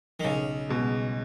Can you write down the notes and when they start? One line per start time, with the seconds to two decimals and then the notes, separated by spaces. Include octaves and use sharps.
0.20 D#3
0.24 B1 C#3
0.69 B2 G#3